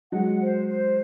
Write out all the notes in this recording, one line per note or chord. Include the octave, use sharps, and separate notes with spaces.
F#3 G#3 F#5
C5
C5